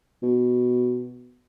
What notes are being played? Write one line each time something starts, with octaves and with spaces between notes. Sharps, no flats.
B2